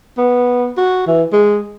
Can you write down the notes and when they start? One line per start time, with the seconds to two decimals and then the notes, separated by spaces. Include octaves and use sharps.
0.17 B3
0.77 F#4
1.07 E3
1.32 G#3